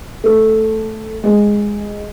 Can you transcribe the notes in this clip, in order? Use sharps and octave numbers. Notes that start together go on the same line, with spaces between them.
A3
G#3